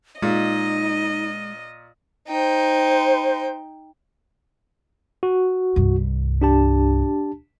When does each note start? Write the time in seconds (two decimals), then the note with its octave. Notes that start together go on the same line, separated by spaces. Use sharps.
0.22 A#2 G#3 D#4 D#5
2.28 D#4 C5 G5
5.23 F#4
5.76 C2 G2
6.41 D4 G4 A5